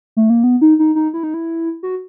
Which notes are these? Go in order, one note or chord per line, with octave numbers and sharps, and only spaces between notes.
A3
A#3
B3
D#4
D#4
D#4
E4
D#4
E4
F#4